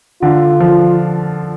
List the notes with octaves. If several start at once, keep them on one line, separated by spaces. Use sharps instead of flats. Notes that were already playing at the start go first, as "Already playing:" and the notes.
D3 F4
F3